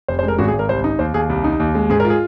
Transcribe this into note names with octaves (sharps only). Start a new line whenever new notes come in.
F1 C5
C5
G#3
A#4
G#1 F#4
G#4
G#1
A#4
C2 C5
D#4
D#2 C5
D#2 G#4
C2
D#4
D#2
G#3
G#2 G#4
A#4
F4
G#4